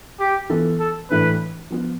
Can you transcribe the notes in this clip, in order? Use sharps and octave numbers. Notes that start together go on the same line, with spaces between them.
G4
E3 B3 F4 A4
A4
A2 E3 A3 D4 B4
F3 B3 F4